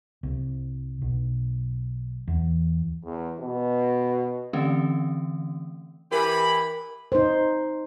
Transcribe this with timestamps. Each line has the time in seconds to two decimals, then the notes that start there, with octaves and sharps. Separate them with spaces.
0.23 C2
1.02 B1
2.28 E2
3.05 E2
3.41 B2
4.53 D3 E3 A3 C4 C#4
6.12 E3 G4 A#4 B5
7.12 D#4 C5